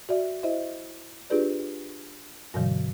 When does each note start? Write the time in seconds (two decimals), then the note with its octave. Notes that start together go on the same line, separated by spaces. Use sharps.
0.09 F#4 D5 E5
0.43 E4 C5 D#5 E5
1.30 D4 F4 G4 G#4 B4 D5
2.54 G2 B2 D3 E3 F#3